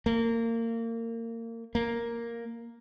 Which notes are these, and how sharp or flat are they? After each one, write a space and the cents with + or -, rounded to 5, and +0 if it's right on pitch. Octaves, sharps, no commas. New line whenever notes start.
A#3 -25
A#3 +0